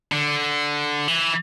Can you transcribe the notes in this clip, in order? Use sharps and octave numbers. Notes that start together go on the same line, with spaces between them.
D3
E3